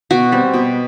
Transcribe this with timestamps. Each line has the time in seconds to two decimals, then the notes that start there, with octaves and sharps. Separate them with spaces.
0.11 B2 F#4
0.32 G3 C4
0.54 B2